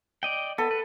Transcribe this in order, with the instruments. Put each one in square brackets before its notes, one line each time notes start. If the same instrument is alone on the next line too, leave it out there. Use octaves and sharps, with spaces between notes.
[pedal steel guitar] D5 D#5 G5
[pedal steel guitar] B3 [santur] A4
[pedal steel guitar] B4